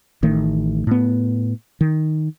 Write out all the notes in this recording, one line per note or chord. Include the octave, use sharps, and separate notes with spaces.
A1 D#3 A3
A2 B3
D#3